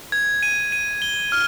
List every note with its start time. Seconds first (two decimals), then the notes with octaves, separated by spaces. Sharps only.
0.12 G#6
0.43 D#7
0.72 D#7
1.02 G7
1.32 F6